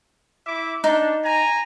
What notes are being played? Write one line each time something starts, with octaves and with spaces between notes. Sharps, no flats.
E4 E5 D6
D4 D#4
G#5 A#5